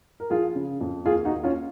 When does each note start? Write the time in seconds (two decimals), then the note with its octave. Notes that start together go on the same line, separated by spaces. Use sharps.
0.20 A#4
0.30 F3 F4 G#4
0.55 C#3
0.81 F2
1.06 D#2 F4 G#4
1.25 D#4 F#4
1.32 D#2
1.43 C#4 F4